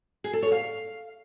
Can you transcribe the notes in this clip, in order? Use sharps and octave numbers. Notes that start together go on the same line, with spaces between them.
G#4
A4
C#5
F5